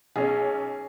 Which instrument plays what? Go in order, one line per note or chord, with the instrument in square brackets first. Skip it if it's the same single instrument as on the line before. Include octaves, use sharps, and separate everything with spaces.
[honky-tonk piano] B1 C#4 [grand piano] G#4